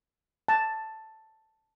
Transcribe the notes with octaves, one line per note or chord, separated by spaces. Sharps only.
A5